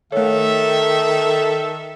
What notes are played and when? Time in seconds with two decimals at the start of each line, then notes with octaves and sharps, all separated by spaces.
0.12 D#3 A3 A4 C#5 E5